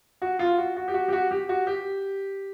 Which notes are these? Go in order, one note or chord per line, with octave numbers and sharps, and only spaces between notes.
F#4
F4
F#4
F#4
G4
F#4
G4
F#4
G4
F#4
G4